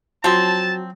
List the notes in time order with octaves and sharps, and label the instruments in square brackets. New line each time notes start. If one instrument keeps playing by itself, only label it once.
[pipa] F3 C4 [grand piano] F#3 [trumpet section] A5